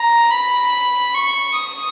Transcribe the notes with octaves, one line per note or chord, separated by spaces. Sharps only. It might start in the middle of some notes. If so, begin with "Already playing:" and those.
Already playing: A#5
B5
C#6
D#6